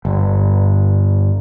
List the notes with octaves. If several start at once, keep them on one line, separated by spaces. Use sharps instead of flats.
G1